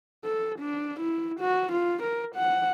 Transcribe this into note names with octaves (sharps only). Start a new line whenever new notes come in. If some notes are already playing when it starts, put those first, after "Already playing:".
A4
D4
E4
F#4
F4
A#4
F#5